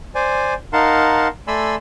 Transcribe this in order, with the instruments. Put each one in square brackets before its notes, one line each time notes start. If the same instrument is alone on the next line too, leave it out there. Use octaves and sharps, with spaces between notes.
[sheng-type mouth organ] C5 D5 G#5
D#4 A#4 F5 F#5 A5 C6
A3 D5 G#5 B5 C6 E6